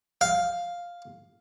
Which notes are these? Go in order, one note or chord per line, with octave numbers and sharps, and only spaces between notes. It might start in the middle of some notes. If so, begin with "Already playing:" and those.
F5